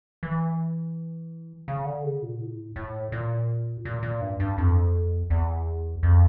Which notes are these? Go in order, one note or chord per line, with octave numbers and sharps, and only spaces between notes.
E3
C#3
D3
C#3
A#2
A2
A2
A#2
A#2
A#2
G2
G2
F2
E2
F2